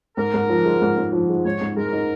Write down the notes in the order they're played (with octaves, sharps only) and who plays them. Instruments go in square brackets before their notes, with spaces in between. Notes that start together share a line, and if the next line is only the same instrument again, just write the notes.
[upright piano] G#2 [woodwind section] A#4
[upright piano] G#2
F3
G#3
G#2
G#2
F3
G#3
[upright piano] G#2 [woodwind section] C#5
[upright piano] G#2
[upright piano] G#3 [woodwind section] A#4
[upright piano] D#4